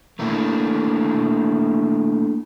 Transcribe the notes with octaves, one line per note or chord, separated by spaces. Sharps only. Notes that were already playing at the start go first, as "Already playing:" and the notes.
A3 A#3 D4 E4